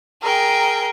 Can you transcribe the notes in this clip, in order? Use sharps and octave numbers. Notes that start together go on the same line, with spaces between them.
G#4 A#4 G5